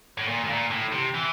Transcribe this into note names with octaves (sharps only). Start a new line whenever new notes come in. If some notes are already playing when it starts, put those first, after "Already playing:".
A2
A#2
A2
A#2
A2
C3
E3